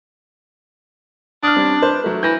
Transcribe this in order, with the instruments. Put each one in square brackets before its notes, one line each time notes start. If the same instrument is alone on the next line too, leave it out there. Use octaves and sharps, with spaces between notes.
[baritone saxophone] D4 [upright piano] D#6 F6
[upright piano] G3 C4 C#4
B4 C5
F#3 A3
[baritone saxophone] E3 [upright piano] G6 A#6